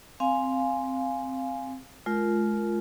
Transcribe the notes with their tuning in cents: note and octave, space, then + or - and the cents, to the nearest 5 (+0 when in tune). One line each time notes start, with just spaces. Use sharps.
C4 +0 F5 +0 G#5 +0
G#3 +40 F4 +0 A#4 +0